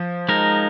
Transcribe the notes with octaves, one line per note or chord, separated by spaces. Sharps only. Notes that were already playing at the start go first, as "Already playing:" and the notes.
Already playing: F3
G#3 D#4 A#4